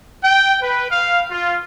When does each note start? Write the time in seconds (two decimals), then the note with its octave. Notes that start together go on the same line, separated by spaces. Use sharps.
0.23 G5
0.61 B4
0.91 F5
1.31 F4